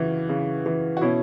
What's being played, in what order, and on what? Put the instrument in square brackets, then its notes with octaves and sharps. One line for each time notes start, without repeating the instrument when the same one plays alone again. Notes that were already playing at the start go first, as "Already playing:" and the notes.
Already playing: [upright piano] C#3 E3 F#4
C#3
E3
F#4
B2 C#4 E4